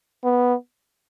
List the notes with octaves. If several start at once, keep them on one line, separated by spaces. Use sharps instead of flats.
B3